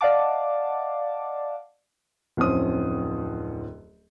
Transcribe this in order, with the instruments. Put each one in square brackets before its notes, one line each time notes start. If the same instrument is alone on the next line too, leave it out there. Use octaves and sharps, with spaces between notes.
[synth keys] D5 D#5 F5 F#5 A5 D6
[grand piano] D1 F2 C#4 C5 D#6